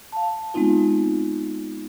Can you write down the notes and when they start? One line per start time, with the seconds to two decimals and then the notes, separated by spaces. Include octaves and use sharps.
0.12 F5 A5
0.54 G#3 B3 C4 D#4 F4